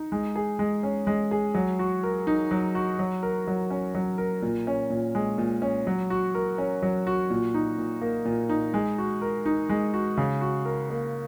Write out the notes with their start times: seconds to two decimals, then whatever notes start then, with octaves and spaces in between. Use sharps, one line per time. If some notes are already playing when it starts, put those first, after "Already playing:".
Already playing: D#4
0.12 G#3
0.36 G#4
0.59 G#3
0.83 C#4
1.07 G#3
1.31 G#4
1.54 F#3
1.79 F#4
2.03 A#4
2.27 D#4
2.51 F#3
2.75 F#4
2.99 F#3
3.23 A#4
3.47 F#3
3.70 C#4
3.95 F#3
4.18 A#4
4.42 A#2
4.67 C#4
4.90 A#2
5.15 G#3
5.38 A#2
5.62 C#4
5.87 F#3
6.10 F#4
6.35 A#4
6.58 C#4
6.82 F#3
7.07 F#4
7.30 A#2
7.54 D#4
7.78 A#2
8.02 A#3
8.25 A#2
8.49 D#4
8.74 G#3
8.98 F#4
9.22 A#4
9.46 D#4
9.69 G#3
9.94 F#4
10.17 C#3
10.41 F#4
10.65 A#4
10.90 A#3